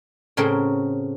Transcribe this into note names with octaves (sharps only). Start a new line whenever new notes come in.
A2 C#3 C4 F#4 A#4 C6